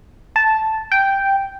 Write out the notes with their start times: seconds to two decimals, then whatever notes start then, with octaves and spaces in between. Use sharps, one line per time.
0.36 A5
0.92 G5